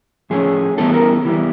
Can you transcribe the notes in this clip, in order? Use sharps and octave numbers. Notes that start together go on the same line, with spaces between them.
A2 F3 A3 C#4 G#4
E3 G3 B3 E4 A4
A#4
E3 G3 B3 E4